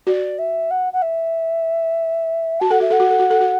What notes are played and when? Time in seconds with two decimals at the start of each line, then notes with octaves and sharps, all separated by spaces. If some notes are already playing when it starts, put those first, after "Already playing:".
0.07 F#4 D5
0.38 E5
0.71 F#5
0.93 F#5
1.02 E5
2.60 F#4 A5
2.70 A4 F#5
2.80 F#4 E5
2.90 A4 F#5
3.00 F#4
3.10 A4
3.19 F#4
3.30 A4
3.40 F#4